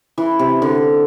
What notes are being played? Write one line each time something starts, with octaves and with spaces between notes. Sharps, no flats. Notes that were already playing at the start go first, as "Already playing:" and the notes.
E3
C3
D3